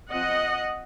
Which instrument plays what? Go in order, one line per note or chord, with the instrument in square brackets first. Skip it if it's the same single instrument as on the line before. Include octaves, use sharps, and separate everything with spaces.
[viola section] F3 C4 D#5 F#5